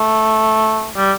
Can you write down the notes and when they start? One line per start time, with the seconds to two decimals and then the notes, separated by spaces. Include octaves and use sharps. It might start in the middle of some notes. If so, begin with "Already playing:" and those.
Already playing: A3
0.97 G3